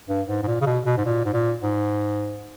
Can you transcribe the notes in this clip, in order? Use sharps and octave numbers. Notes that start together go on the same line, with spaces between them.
G2
G#2
G#2
A#2
C#3
B2
B2
G#2
A#2
G#2
A#2
G#2